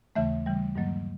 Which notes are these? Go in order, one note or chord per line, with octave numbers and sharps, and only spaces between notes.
D#2 C#3 E3 A3 E5
C#3 E3 G3
G2 D#3 F#3 A#3